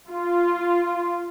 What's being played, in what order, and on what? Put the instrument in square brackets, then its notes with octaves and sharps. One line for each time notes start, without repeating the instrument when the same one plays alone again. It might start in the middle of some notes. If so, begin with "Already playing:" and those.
[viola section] F4